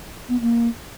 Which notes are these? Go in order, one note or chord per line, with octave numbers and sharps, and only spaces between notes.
B3
A#3